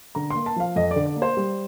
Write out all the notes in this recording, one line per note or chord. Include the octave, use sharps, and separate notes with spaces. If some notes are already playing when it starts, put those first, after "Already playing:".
D3 A#5
A#3 C6
A5
F3 F5
F2 D#5
D5
D3
D5
A#3
C5
G3